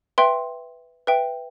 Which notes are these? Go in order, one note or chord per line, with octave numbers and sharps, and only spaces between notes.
B4 E5 G5 C6
B4 E5 G5